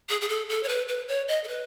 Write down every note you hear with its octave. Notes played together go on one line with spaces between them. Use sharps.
G#4
G#4
A4
A4
C#5
B4
B4
C#5
D#5
A4
B4